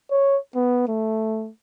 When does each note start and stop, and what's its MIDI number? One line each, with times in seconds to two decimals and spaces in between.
0.11 0.38 73
0.55 0.83 59
0.88 1.50 57